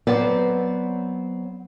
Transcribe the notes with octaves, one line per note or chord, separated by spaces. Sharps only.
F#3 B3 C4 B4 C5 D5